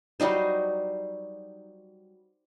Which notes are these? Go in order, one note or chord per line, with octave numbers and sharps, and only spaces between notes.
F#3 G3 D#4 C5